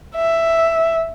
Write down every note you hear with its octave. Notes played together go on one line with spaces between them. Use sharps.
E5